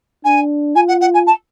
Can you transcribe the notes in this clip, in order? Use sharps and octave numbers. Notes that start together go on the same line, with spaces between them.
D4 G#5
F4 G#5
F#5
F#5
G#5
A5